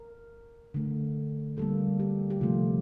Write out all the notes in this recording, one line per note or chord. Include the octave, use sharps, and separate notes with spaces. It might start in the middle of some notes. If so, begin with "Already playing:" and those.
Already playing: A#4
D3 A3
D3 G3 A#3 A4
G4
G4
C3 F3 A3 F4